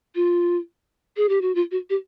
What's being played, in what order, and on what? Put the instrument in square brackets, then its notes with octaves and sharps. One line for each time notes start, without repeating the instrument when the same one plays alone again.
[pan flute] F4
G#4
G4
F#4
F4
F#4
G4